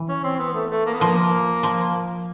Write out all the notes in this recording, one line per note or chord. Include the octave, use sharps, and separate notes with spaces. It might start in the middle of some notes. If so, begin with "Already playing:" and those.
Already playing: E3
C#4
C4
B3
A3
A3
A#3
B3
F3 A#3
F3